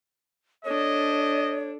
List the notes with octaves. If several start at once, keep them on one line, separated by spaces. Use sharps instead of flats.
D4 A4 C#5 D#5